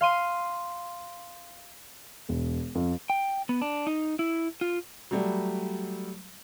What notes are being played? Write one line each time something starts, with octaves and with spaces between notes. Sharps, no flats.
F5 C6 D#7
E1
F2
G5
B3
D4
D#4
E4
F4
F#3 G3 A3